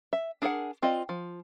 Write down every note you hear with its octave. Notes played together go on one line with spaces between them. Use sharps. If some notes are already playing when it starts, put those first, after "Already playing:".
E5
D4 G#4 A#4 E5 F#5
C4 F4 D5 D#5
F3